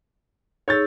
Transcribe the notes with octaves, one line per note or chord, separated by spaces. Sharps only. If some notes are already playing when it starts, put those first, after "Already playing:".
D#4 G#4 C#5 E6 G6 A6